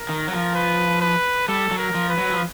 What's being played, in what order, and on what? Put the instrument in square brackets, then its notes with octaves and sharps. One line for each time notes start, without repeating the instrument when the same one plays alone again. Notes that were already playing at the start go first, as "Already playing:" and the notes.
Already playing: [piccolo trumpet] A#4
[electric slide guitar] D#3
F#3
F3
[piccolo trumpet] B4
B4
[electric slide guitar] G3 [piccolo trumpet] A4
[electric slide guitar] F#3
[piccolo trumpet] A#4
[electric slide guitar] F3
[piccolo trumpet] B4
[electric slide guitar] F#3
F3